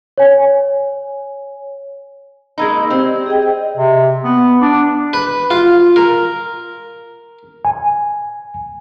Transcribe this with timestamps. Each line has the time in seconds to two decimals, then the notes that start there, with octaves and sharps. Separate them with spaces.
0.18 C#5 G#5
2.58 G#3 A#3 D#4 B5 E6 G#6
2.90 C4 G4 C5 D5
3.26 G#4 D#5 G5
3.42 D#5
3.77 C3
4.24 B3
4.61 D4
5.13 B4
5.51 F4
5.96 A#4
7.65 G#5